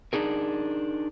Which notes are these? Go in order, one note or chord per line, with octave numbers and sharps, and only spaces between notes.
D4 D#4 G#4 A#4